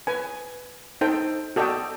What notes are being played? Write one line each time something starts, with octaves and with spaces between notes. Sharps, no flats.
B4 G#5
D#4 A4 C5 G5
F#4 A4 D5 D#5 G5